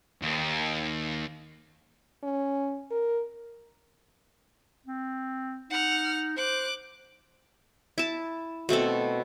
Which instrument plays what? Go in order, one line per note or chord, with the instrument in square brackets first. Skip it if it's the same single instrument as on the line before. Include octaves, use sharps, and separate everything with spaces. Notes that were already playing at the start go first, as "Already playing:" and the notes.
[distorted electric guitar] D#2
[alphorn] C#4
A#4
[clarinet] C4
[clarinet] D#4 [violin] F#5 F6
[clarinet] C5 [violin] D6 F#6
[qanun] E4 A5
B2 A3 C4 A4